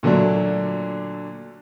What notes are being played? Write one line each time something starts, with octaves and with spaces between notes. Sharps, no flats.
A#2 D3 F#3 A3 D4